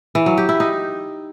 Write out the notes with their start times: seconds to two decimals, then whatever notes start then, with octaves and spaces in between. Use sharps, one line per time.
0.15 E3
0.26 F#3
0.37 G4
0.49 E4
0.60 D#4